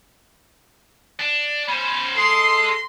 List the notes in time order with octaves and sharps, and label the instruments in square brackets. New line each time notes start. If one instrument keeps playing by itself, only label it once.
[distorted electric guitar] D4
[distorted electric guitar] C#4 C5 [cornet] B5
[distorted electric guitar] G#3 [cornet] A4 [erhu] C6 [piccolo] C7